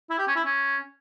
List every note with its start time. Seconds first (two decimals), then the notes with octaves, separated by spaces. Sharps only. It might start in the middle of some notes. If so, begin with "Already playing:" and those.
0.10 E4
0.18 G4
0.27 C#4
0.36 E4
0.44 C#4